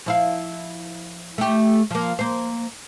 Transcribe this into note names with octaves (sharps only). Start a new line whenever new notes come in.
F3 E4 F5
A3 G4
F3 A#3
A#3 C5